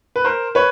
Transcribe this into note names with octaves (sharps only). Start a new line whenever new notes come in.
B4
A#4 C5
B4 C#5